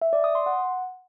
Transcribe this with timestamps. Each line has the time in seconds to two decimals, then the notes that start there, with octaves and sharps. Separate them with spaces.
0.02 E5
0.13 D5
0.24 D#6
0.35 C6
0.46 F#5